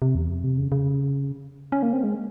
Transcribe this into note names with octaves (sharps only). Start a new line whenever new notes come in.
C3
E2
F2
C3
C#3
C#3
C#4
A#3
C4
G#3